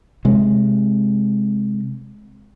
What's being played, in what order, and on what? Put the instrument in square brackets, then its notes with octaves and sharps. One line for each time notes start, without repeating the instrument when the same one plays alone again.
[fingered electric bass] C3 G#3